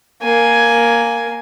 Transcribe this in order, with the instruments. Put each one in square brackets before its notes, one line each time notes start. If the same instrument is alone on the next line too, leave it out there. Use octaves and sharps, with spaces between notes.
[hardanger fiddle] A#3 G#5